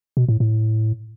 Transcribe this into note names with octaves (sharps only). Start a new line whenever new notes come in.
B2
A2
A2